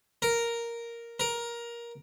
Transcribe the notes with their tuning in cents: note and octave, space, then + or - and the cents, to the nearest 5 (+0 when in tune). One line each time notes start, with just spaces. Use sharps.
A#4 +0
A#4 +15